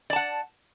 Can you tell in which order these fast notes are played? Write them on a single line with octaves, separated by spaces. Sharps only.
D5 A5 F#5